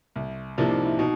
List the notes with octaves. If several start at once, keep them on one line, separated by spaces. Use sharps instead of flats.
C2
C3 F3 A#3 D4 E4
D#4
E4
B2 D#4